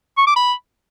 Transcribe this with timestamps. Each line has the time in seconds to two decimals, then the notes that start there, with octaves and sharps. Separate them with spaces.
0.18 C#6
0.27 D6
0.36 B5